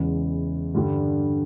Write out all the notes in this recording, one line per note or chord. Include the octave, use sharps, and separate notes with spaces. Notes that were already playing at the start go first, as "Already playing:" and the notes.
Already playing: E2 C#3 E3 G#3
G2 D3 G3